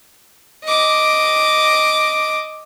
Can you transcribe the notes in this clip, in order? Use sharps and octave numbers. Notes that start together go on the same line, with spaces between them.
D#5 D6